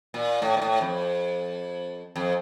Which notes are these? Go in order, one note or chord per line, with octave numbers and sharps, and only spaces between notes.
A#2
A2
A#2
A2
F2
F2